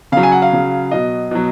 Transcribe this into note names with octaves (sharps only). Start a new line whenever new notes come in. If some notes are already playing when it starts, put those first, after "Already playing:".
C#3 F#3 F5
G#5
F#5
F5
C#3 F#3
B2 F#3 D#5
B2 F#3